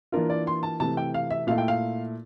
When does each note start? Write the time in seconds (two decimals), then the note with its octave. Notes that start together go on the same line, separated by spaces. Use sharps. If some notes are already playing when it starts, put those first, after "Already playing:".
0.12 E3 A#3 D4 F4 A#4
0.30 D5
0.47 C6
0.63 A5
0.80 C3 E3 A3 A5
0.97 G5
1.14 F5
1.30 E5
1.47 A#2 A3 E4 F5
1.58 G5
1.68 F5